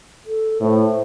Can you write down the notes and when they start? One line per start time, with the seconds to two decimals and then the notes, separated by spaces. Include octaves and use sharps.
0.26 A4
0.61 A2 C5